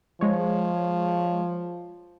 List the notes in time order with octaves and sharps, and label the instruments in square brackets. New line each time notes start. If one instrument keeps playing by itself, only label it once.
[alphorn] F3 [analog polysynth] G#3 C#5